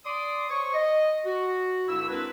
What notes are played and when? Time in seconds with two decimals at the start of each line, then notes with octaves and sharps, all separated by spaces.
0.05 D5 C6 D6 D#6
0.49 C5 C#5 C#6
0.74 D#5
1.25 F#4
1.87 C#2 G2 D3 E4 E6
2.08 C4 D4 E4 F#4 A#4 B4